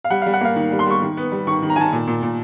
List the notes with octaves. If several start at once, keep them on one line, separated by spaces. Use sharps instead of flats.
F5
G3 F#5
G3 F5
F#5
A#3 F5
D#3
G3
C6
G3 C#6
D#3
B3
G3
D#3 C#6
D#3
A#5
D#3 G#5 A5
A#2
A#2
A#2